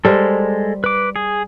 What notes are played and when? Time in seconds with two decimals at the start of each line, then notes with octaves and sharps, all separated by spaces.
0.05 G3 G#3 A4 A#4 C5
0.84 B4 D6
1.16 G#4